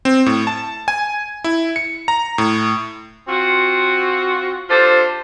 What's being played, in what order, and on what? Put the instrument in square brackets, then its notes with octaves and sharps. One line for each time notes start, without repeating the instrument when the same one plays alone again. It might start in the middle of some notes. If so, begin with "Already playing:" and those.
[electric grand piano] C4
A2
A5
G#5
E4
C#7
A#5
A2
[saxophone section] C4 F4 F#4
D4 F4 G4 A4 C5